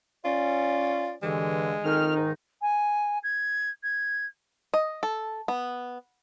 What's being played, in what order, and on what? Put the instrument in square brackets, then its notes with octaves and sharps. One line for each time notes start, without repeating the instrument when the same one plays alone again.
[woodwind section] C#4 D5 [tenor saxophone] F4
[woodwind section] G2 D3 E3 [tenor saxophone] G#3
[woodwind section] F2 F6 [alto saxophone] D#3
[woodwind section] G#2 D#4
[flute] G#5
G#6
G#6
[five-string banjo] D#5
A4
B3